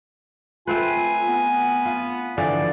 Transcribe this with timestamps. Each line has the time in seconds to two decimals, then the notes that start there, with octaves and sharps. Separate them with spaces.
0.67 A3 C4 F4 B4 G#5
1.27 B3
1.85 F4
2.38 D3 E3 F3 D5